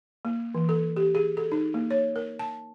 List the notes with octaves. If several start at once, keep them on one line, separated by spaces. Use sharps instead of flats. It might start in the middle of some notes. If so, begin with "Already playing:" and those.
A#3
E3
A4
G4
G#4
A4
D#4
A#3
C#5
A#4
A5